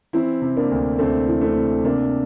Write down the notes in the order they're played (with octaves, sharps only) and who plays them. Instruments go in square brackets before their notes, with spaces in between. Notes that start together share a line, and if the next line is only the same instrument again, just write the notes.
[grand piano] E3 C4 E4
C3
A#3 D4
D2
D2 A3 C4
E3
A3 C4
C3
C3 A#3 D4